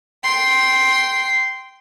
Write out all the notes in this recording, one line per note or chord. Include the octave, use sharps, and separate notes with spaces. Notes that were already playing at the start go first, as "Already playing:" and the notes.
G5 C6